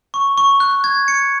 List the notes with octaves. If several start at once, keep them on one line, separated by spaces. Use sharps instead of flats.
C#6
C#6
F#6
G#6
C#7